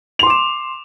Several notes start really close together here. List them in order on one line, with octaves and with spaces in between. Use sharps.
F7 C6 D6 E7